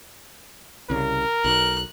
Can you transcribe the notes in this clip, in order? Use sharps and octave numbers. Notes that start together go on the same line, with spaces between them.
C2 C#3 A#4
B1 F#6